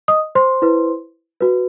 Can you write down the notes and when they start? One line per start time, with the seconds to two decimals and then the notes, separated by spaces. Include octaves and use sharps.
0.08 D#5 D#6
0.35 C5 C6
0.62 E4 B4
1.40 F#4 B4